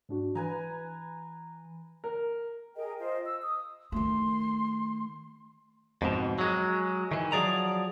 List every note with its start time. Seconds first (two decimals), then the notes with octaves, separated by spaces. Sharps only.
0.09 G#2 D4 F#4
0.35 E3 B4 G#5 A#5
2.04 A#4
2.76 G#4 A#4 D#5 G5
2.99 F4 C5 D#5
3.26 E6
3.43 D#6
3.92 D#3 A3 C6
6.02 F2 G#2 B2
6.39 F#3 G#3
7.11 D#3 E3
7.32 F3 F#3 G#4 D5 A#5